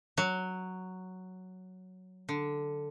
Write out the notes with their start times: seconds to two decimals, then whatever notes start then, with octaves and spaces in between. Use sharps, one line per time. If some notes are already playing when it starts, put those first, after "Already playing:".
0.17 F#3
2.29 D3